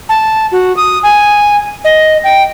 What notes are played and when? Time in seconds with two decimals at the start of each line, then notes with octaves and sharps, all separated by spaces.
0.09 A5
0.52 F#4
0.77 D#6
1.03 G#5
1.85 D#5
2.24 G5